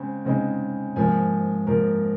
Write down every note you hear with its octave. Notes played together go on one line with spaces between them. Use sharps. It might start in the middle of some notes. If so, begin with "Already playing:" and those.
Already playing: C#3 G#3 C4
C#3 G#3 C4 D#4
G#2 F3 A#3 G#5
G#2 F3 A#3 A#4